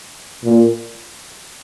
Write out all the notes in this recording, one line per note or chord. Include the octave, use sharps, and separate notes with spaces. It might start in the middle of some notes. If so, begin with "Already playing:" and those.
A#2